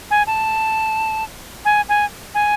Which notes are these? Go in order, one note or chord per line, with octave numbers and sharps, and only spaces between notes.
G#5
A5
G#5
G#5
G#5